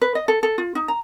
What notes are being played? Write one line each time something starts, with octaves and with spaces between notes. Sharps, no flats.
B4
D#5
A4
A4
F4
D#4
A#5